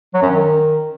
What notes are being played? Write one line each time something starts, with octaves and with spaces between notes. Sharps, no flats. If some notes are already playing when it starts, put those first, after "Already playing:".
F#3
F#2
D#3